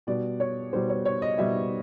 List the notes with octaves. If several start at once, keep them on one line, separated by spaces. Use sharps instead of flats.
B2 G3 D5
C#5
B2 G3 C5
C#5
C#5
D#5
B2 G3 E5